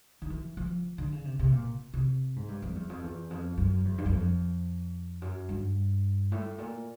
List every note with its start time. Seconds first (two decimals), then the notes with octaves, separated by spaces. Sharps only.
0.22 D#3
0.30 E3
0.57 F3
0.98 D3
1.12 C#3
1.25 C3
1.39 C3
1.52 A#2
1.93 C3
2.36 G#2
2.48 G2
2.62 F2
2.75 E2
2.89 F2
3.03 E2
3.30 F2
3.58 F#2
3.85 E2
3.98 G2
4.06 F#2
4.12 F2
5.22 F#2
5.49 G2
6.32 A2
6.58 A#2